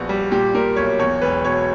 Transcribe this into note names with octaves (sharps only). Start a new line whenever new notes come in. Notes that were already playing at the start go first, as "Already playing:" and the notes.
Already playing: A#1 B3 F#4
G3
A#2 G4
A#2 A#4
B1 C#5
E2 C#5
E1 B4
B2 C#5